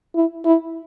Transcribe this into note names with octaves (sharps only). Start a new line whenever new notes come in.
E4
E4